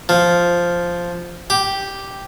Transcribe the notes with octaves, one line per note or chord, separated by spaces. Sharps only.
F3
G4